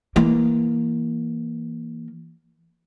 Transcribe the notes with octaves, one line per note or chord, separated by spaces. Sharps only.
E3 A#3